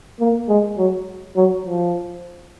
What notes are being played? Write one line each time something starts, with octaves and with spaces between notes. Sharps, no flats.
A#3
G#3
F#3
F#3
F3